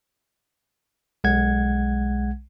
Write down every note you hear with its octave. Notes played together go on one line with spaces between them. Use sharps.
B1 G#3 F#5 G#6